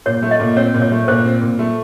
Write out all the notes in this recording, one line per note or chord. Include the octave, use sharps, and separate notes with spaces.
A#2 C#5
A3
D#5
A#2
C4 C#5
A#2
C#5
A3
A#2 C5
C4
A#2
A3